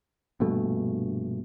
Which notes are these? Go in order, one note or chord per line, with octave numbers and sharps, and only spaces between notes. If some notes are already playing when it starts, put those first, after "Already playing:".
A#1 G2 B2 A3